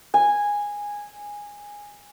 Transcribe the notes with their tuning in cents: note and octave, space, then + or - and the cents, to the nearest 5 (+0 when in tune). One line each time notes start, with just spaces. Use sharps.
G#5 -10